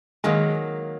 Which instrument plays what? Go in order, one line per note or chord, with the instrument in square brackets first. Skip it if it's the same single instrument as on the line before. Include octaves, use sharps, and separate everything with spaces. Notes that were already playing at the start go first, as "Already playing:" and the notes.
[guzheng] D#3 F#3 A#3 [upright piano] G#3